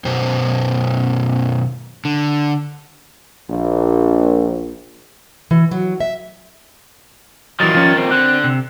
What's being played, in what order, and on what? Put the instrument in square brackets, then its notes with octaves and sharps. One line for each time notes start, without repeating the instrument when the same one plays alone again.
[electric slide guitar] F#2 B2 C5
D3
[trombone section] A#1
[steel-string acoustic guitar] E3
F#3
E5
[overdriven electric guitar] A#2 D#3 [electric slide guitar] E3 F#3 [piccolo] A6
[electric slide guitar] F3 C#4
C4
[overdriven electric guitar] D3 [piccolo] F#6
[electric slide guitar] C3